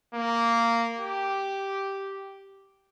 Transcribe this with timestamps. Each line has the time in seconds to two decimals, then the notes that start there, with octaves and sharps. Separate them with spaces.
0.14 A#3
0.99 G4